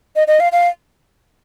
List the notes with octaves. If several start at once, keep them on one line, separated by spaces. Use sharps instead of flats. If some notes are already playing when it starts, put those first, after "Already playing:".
D#5
D#5
F5
F5